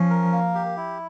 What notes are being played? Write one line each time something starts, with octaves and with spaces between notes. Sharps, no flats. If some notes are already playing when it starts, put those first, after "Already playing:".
Already playing: F3 C#4
A#4
A#3
G4
E4